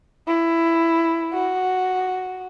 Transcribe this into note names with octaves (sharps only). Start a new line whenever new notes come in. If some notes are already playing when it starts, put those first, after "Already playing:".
E4
F#4